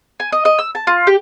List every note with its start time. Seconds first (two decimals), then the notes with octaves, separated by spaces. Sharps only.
0.20 G#5
0.32 D#5
0.45 D#5
0.59 E6
0.75 A5
0.87 F4
1.07 G4